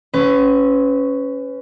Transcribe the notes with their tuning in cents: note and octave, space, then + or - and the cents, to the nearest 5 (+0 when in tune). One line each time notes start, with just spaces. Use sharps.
C#4 +0 B4 +30